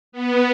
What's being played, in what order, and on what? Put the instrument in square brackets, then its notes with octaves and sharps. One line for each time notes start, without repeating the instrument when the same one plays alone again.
[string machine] B3